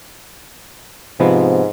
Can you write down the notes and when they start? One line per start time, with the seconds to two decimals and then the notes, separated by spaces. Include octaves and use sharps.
1.20 G#2 C3 F3 B3